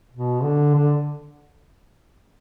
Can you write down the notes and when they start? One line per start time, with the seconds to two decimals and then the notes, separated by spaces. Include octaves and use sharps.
0.12 B2
0.43 D3
0.75 D3